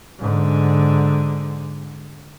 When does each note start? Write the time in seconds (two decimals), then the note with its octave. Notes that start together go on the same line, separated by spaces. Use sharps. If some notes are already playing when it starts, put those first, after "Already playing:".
0.19 G#2 D3